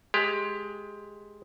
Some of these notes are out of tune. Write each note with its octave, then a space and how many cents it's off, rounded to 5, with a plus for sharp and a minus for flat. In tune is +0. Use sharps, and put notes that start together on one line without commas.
G#3 +10 G4 +20